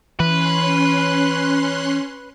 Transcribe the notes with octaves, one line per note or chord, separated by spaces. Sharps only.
E3 C#4 B4 C6 F#6